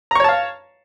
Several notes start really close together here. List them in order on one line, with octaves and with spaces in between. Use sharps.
A#5 C#6 C#5 A5 F5